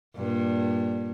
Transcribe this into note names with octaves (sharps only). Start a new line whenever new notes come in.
G2 A#2